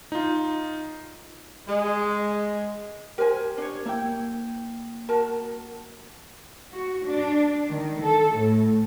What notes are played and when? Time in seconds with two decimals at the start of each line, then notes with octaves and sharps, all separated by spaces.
0.12 D#4 F4
1.68 G#3
3.18 G4 A#4 C5 G#5
3.58 D4 C#5
3.86 A#3 E4 G5
5.09 F#4 A#4 A5
6.73 F#4
7.06 D4
7.68 D#3
8.01 A4
8.36 A2